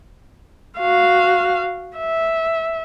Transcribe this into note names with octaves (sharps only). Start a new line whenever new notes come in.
F#4 F5
E5